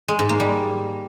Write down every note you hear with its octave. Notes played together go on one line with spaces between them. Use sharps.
G#3
G#2
A#3
G3